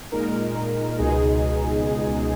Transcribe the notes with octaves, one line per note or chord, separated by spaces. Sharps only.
A#2 G#3 D#4 A#4
C#2 B2 G#3 D#4 G#4